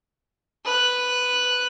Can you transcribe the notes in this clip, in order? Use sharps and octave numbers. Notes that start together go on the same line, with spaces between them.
B4 F#6